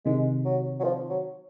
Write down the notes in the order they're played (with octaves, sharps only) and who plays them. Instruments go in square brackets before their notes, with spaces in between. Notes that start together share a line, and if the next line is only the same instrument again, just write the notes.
[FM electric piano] C3 D#3 [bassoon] G#3
[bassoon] F#3
F#3
F3
F#3